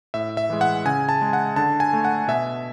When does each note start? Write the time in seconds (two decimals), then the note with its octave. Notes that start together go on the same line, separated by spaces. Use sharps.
0.14 A2 E5
0.37 E5
0.50 E3 G#3
0.61 F#5
0.85 C#3 G#5
1.09 A5
1.22 G#3
1.33 F#5
1.56 D3 A5
1.80 G#5
1.93 A3
2.05 F#5
2.28 B2 E5